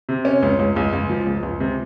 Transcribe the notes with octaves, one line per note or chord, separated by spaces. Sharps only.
C3
C#4
C#2
C#2
C#2
C#2
F3
C#2
C#2
C3